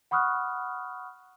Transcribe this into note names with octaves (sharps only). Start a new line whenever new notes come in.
F#5 B5 C#6 D#6 F6 F#6